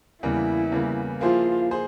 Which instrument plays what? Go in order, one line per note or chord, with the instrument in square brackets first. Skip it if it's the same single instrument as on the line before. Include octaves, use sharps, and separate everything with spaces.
[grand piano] E2 C#3 G3 A#3 [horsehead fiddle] E4
[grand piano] E2 C#3 G3 A#3
[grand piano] F3 A#3 E4 G#4 C5 [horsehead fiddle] F4
[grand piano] G#4 C5